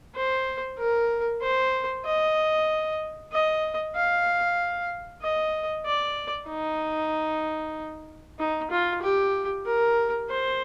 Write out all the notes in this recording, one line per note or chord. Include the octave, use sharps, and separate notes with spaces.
C5
A#4
C5
D#5
D#5
F5
D#5
D5
D#4
D#4
F4
G4
A#4
C5